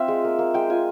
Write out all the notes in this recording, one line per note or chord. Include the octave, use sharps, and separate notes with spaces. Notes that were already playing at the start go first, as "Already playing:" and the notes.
Already playing: C4 F4 E5
G#3
A#3
A#3
G#3 G5
F4 G#5